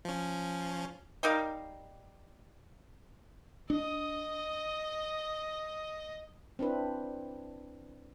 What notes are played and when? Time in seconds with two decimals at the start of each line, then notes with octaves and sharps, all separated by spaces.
0.05 F3 C#4
1.23 G3 D#4 A#4 F5
3.70 D4 D#5 D#6
6.59 C4 D4 E4 B4